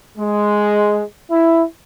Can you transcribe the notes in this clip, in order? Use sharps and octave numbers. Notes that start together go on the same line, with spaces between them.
G#3
E4